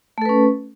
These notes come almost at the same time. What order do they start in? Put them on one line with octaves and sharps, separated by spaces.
A3 A4 B4 C#4